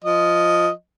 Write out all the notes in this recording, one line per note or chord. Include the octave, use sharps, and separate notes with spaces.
F3 D#5